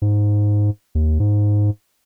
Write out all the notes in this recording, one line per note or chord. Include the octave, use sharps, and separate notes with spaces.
G#2
D#2
G#2